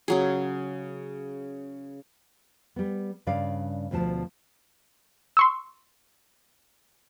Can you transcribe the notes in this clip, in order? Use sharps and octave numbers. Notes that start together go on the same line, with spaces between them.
C#3 F#3 G#4
G3 B3
G2 C#3 D5 F5
D2 B2 F3 A5
C6 C#6 E6